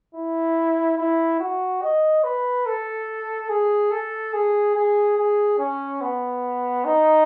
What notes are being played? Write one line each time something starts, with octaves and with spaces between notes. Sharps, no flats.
E4
E4
F#4
D#5
B4
A4
G#4
A4
G#4
G#4
G#4
C#4
B3
D#4